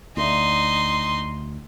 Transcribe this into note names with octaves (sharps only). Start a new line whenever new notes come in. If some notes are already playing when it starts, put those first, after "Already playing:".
D2 D#4 C6